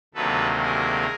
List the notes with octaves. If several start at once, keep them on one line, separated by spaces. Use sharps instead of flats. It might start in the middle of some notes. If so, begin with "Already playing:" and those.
D2 C3 D#3 F#3 A#3 A4 B4
G#4 A#4